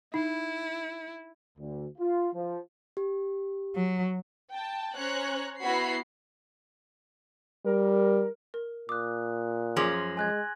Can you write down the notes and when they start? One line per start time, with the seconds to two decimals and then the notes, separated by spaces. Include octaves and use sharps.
0.14 D#4 E4
1.59 D2
1.98 F4
2.34 F3
2.97 G4
3.76 F#3
4.51 G5 A5
4.97 C#4 C5 C#5 A#5 F#6
5.61 B3 E4 F#4 A#5 B5 C7
7.65 G3 A#4
8.54 A#4
8.89 A#2 D6 D#6 F#6
9.76 F#2 F3 C#4 G#4 C6 D6 A#6 F#7
10.17 G#3 G#5 F#6 G#6